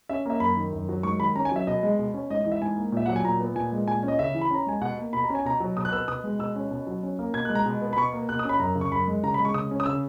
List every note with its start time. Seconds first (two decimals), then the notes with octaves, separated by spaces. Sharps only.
0.09 C#4 E5
0.26 A#3 E5
0.40 F#2 B5
0.56 D#3
0.73 F#2
0.89 F#3
1.03 G#2 C#6
1.19 D#3 B5
1.36 C#4 A#5
1.45 G#5
1.52 F#3 E5
1.67 B2 D#5
1.83 G#3
1.99 B2
2.14 C#4
2.30 G#2 D#5
2.41 D#5
2.45 E3
2.52 E5
2.62 G#2 G#5
2.77 A#3
2.92 A#2 E5
3.06 F#3 F#5
3.16 G#5
3.24 A#2 A#5
3.40 B3
3.55 A#2 G#5
3.72 G#3
3.87 A#2 G#5
4.03 C#4
4.08 D#5
4.19 C#3 E5
4.35 E3
4.41 B5
4.51 C#4 A#5
4.67 G#3 G#5
4.81 B2 F#5
4.98 A#3
5.13 B2 B5
5.24 A#5
5.30 C#4
5.35 G#5
5.45 B2 A#5
5.60 F#3
5.77 B2 D#6
5.85 F#6
5.92 B3 E6
6.08 B2 D#6
6.24 G#3
6.39 B2 E6
6.56 C#4
6.71 B2
6.87 F#3
7.03 C#4
7.19 A#3
7.34 B2 G#6
7.45 F#6
7.50 G#3
7.55 A#5
7.66 B2
7.82 B3
7.93 B5
7.97 B2 C#6
8.13 A#3
8.29 B2 F#6
8.39 D#6
8.45 C#4 B5
8.60 F#2 A#5
8.75 C#3
8.81 C#6
8.91 F#2 B5
9.08 G#3
9.23 C#3 A#5
9.34 B5
9.40 G#3
9.45 C#6
9.54 C#3 D#6
9.71 C#4
9.80 D#6
9.86 C#3 E6